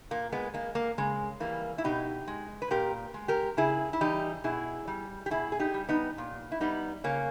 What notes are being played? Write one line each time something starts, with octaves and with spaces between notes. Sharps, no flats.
A#2 A#3
G#3 B3
G#3 A#3
A#3
C#3 G#3
E3 G3 A#3
E4
B2 D#4 G4
G#3
B4
A#2 G4 A#4
G#3
G4 A#4
C#3 E4 G#4
E4
E3 G3 D#4 G4
B2 E4 G#4
G3
G4
B2 E4 G#4
G#4
D#4 G4
G3
B3 D#4
A#2
E4
G3 B3 D#4
C#3 A#3 C#4